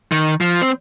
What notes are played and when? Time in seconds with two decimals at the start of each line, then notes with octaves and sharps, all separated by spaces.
0.12 D#3
0.41 F3
0.62 C4